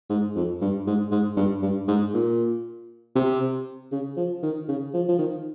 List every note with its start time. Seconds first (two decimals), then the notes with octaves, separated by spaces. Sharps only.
0.10 G#2
0.36 F2
0.62 G2
0.87 G#2
1.11 G#2
1.37 G2
1.63 G2
1.88 G#2
2.14 A#2
3.16 C3
3.92 C#3
4.17 F3
4.43 D#3
4.68 C#3
4.94 F3
5.09 F3
5.19 D#3